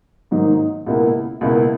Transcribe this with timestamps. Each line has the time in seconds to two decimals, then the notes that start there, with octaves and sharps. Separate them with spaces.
0.31 G#2 D#3 F#3 A#3 D#4
0.86 C#2 B2 A#3 E4
1.41 C#2 B2 A#3 E4